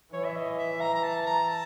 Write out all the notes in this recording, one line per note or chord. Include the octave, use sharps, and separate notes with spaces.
E3 C#5
E5
D#5
E5
A#5
A#5
A5
A#5
A5